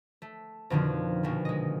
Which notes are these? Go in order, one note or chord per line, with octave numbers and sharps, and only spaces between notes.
A3
F2 B2 D3 D#3 F3
A#1 B2
G#3 D#5